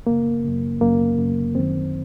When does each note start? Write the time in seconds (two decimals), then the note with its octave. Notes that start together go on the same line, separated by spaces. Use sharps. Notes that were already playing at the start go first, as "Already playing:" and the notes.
0.07 F#2 C#3 A#3
0.44 F#2 C#3
0.81 F#2 C#3 A#3
1.18 F#2 C#3
1.55 F#2 D#3 C4